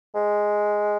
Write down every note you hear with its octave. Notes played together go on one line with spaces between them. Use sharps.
G#3